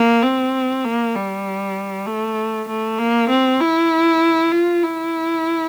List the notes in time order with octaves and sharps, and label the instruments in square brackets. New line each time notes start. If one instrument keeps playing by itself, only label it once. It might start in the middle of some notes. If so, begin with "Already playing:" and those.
Already playing: [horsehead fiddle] A#3
C4
A#3
G3
A3
A3
A#3
C4
E4
F4
E4